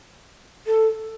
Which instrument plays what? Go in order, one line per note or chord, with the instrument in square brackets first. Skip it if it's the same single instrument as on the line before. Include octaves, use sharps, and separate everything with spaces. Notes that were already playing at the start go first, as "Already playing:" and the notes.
[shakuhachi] A4